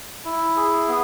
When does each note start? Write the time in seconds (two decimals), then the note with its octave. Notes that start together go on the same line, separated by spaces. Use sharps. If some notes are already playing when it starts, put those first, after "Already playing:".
0.25 E4
0.56 G#4
0.88 B3